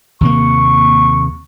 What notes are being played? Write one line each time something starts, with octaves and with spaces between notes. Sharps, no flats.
D#2 C3 A#3 C#6